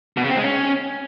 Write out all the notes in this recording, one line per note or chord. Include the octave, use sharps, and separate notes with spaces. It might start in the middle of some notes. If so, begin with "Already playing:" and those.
B2
C#3
C4
G#3
C#4